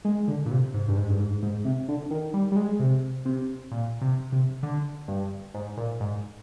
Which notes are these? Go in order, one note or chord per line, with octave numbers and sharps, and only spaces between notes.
G#3
D3
A#2
C3
G#2
G2
G#2
G2
G#2
G#2
C3
D3
D#3
G3
G3
G#3
C3
C3
A#2
C3
C3
D3
G2
G#2
A#2
G#2